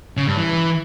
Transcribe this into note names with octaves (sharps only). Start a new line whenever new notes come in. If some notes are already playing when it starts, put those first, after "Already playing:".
C#3
G2
E3